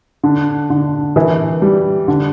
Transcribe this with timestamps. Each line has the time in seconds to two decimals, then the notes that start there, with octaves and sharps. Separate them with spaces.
0.23 D3
0.70 D3
1.16 E3
1.62 G3
2.08 D3